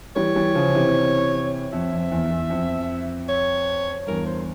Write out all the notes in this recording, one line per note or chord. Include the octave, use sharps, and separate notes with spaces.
E3 G3 C#5
E3 G3
C#3 F3
C3 E3
F2 E5
F2
E2
E2
F2
C#5
E2 G2 A#4
C5